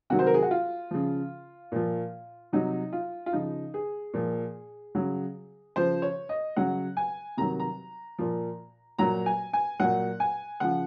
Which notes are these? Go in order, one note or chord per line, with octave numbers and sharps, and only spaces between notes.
C3 D#3 F#3 F#4
C5
A#4
G#4
F#4
F4
C#3 F3
A#2 F3
C3 F#3 D#4
F4
F4
C#3 F3 D#4
G#4
A#2 F3
C#3 F#3
C#3 F3 C5
C#5
D#5
C#3 F#3 F#5
G#5
C3 D#3 F#3 A#5
A#5
A#2 F3
A#2 F#3 A#5
G#5
G#5
A#2 F#3 F#5
G#5
C#3 F3 F#5